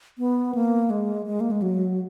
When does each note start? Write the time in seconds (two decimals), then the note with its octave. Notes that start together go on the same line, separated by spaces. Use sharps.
0.18 B3
0.55 A#3
0.90 G#3
1.26 G#3
1.40 A#3
1.51 G#3
1.62 F#3